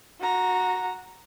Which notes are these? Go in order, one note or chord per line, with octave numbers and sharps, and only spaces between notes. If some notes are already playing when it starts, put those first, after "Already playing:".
F#4 A#5